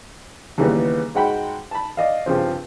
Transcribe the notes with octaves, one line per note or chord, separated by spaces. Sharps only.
D#2 C#3 E3 G3 B3
G#2 G#3 F#4 F#5 G5 B5
A5 B5
D5 D#5 F5
G2 C#3 F3 C4